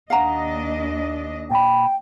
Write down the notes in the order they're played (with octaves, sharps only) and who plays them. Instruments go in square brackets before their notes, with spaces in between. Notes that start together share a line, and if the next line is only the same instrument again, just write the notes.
[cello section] D#2 D4 D#5 [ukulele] F5 F#5 A#5
[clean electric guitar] A#2 B5 [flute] G5